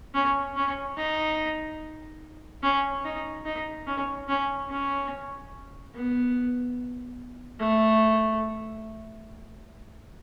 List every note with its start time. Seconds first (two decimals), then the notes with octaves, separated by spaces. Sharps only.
0.14 C#4
0.56 C#4
0.97 D#4
2.63 C#4
3.05 D#4
3.45 D#4
3.87 C#4
4.29 C#4
4.70 C#4
5.94 B3
7.60 A3